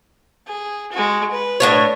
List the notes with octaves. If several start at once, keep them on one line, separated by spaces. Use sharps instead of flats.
G#4
G#3 F#4
B4
A2 D4 C#5